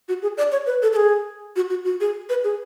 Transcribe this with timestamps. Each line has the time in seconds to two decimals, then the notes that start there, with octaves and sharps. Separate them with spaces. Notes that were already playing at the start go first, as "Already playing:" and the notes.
0.09 F#4
0.22 G#4
0.38 D5
0.52 C#5
0.67 B4
0.82 A4
0.92 A4
0.96 G#4
1.56 F#4
1.70 F#4
1.85 F#4
2.01 G#4
2.29 B4
2.44 G#4